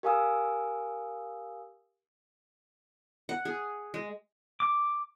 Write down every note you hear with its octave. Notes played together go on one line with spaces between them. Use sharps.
G4 A#4 F5 G#5 D#6 E6
F#5
G#4
G#3
D6